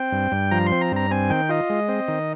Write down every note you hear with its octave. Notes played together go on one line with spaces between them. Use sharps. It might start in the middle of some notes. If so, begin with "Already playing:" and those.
Already playing: C4 G5
G2
G2
F3 A#5
C6
C4
A#5
G2 A#5
C4 G#5
D#3 G5
F4 D#5
G#3
C4
D#3